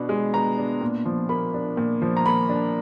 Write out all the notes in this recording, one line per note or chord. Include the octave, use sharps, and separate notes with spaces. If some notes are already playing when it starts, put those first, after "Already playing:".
Already playing: B2 B3 D4
G#3
B3 A#5
D4
A#2
F3
A#3 B5
D4
A#2
F3
A#5
A#3 B5
D4